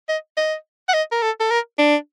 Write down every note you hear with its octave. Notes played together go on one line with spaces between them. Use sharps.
D#5
D#5
F#5
D#5
A#4
A4
A4
A#4
D4